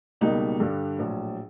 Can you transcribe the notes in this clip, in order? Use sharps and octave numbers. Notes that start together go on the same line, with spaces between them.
C#2 B2 G3 A#3 D#4
G2 D3 G3
A#1 A2 F#3